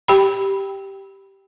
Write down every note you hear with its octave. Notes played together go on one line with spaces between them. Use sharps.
G4 G5 B5